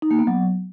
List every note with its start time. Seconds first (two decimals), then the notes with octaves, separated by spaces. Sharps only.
0.02 D#4
0.11 A#3
0.19 B3
0.27 F#3